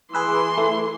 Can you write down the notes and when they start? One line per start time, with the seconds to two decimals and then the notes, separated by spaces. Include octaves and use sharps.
0.14 E3 G#4 B4 C6 E6
0.58 A3